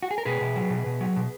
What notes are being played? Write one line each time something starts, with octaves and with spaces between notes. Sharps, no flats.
F#4
G#4
A#4
B2 G#4 B4
B2
F#3
B2
B2
F#3
B2